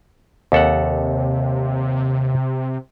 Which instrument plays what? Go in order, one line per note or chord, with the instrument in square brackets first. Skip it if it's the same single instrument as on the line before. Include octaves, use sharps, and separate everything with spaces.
[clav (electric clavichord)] D#2 A4 F#5 [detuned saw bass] C3